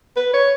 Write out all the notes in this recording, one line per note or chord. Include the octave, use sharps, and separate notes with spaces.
B4
C#5